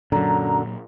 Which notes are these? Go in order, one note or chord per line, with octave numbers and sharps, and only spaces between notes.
F#2 A#2 D3 F#3 A#5